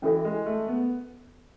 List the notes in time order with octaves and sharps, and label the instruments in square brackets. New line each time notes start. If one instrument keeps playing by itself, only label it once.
[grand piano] E3 [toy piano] C#4 F#4 A4 E5
[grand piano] G#3
A3
B3